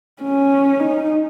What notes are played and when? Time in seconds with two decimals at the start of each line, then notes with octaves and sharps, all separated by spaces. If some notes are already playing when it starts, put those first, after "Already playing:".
0.22 C#4
0.79 D#4